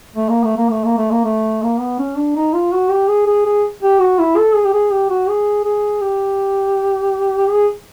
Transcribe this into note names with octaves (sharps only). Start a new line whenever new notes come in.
A3
A#3
A3
A#3
A3
A#3
A3
A#3
A3
A#3
B3
C#4
D4
D#4
F4
F#4
G4
G#4
G#4
G#4
G4
F#4
E4
A4
G#4
G4
G#4
G4
F#4
G#4
G#4
G4
G#4